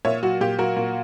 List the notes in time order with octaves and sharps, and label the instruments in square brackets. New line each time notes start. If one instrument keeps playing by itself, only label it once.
[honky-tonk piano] A#2 C#5 E5
F#3 F#4
A#2 G4
F#3 F#4 A#4
A#2